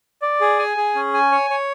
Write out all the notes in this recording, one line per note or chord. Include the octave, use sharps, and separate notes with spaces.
D5
G#4
G#5
G#4
C#4
G#5
C#5
C#5